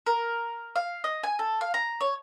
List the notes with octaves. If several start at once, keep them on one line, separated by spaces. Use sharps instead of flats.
A#4
F5
D#5
G#5
A4
F5
A#5
C#5